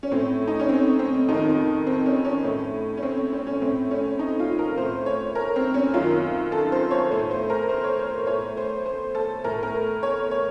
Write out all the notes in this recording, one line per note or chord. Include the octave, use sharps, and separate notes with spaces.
C#4
A2 C4
D#4
C#4
C4
C4
F2 D#3 D#4
C4
C#4
C#4
A2
C#4
C4
C#4
C#4
A2 C4
C#4
D#4
F4
A#4
A2 C5
C#5
A#4
C4
C#4
F#2 D#3 F4
A4
C5
C#5
A2 C5
C5
A#4
C5
C#5
C5
A2 C#5
C5
C5
A4
A2 A#4
A#4
C#5
C#5